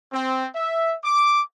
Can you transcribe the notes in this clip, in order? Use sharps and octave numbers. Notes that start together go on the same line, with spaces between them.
C4
E5
D6